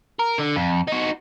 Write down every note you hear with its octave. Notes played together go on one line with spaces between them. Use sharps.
A#4
D3
F2
D#4 F#4